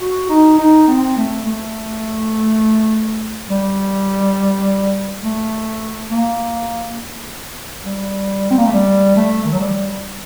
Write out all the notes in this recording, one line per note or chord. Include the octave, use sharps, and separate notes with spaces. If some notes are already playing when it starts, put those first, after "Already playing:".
F#4
D#4
D#4
C4
A3
A3
G3
A3
A#3
G3
C4
A#3
A3
G3
A3
D#3
F#3
G3